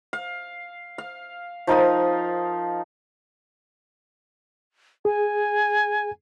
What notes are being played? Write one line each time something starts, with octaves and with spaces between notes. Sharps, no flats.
F5
F5
F3 D#4 A#4 D#6
G#4 G#5